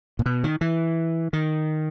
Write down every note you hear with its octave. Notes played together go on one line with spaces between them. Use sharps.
A#2
B2
D#3
E3
D#3